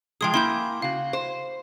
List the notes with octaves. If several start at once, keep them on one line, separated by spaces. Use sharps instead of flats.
F3 G#3 G#4 G5 C6 D#6
A#3 E4 G#5 C6 G6
C#3 F#4 F5
C5